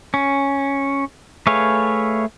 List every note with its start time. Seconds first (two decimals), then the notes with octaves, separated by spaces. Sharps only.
0.14 C#4
1.47 A3 G#4 B4 C#5 F5